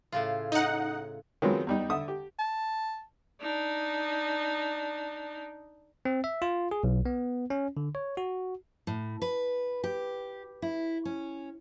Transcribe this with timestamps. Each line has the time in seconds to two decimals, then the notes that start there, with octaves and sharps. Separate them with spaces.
0.12 A2 C#3 F4
0.52 D#4 F#5
1.42 D#3 F3 F#3 G#3 B3 C4
1.67 E2 G3 D#4
1.90 D3 A4 E5 D#6
2.08 G4
2.39 A5
3.41 D4 D#4
6.05 C4
6.24 E5
6.42 F4
6.71 G#4
6.84 B1
7.05 B3
7.50 C#4
7.77 D3
7.95 C#5
8.17 F#4
8.87 A2
9.22 B4
9.84 G4
10.62 E4
11.05 C#4